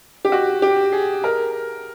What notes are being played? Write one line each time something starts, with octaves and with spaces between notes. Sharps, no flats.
G4
F#4
G4
G#4
A#4